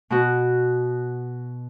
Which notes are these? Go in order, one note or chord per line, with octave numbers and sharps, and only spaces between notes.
B2 B3 F#4